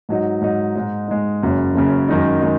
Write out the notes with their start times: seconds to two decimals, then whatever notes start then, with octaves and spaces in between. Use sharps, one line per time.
0.09 G#2 F#3 D#4
0.41 G#2 F#3 D#4
0.75 G#2 G#3 D#4
1.08 G#2 G#3 D#4
1.42 F#1 F#2 C#3
1.75 F#1 F#2 C#3
2.08 F#2 D#3 G#3 D#4
2.41 D#3 G#3 D#4